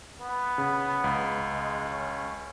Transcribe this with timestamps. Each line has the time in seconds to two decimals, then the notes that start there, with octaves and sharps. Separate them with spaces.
0.20 B3
0.58 C#3
1.04 C#2
1.50 G#3
1.90 C#4